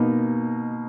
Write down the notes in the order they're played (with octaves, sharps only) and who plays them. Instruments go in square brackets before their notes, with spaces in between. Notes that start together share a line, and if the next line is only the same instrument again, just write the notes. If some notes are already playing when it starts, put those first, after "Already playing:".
Already playing: [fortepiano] B2 A#3 D#4